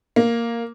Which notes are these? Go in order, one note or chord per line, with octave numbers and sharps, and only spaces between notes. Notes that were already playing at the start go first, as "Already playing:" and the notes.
A#3